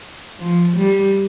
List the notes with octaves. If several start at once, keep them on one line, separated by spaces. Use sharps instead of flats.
F3
G3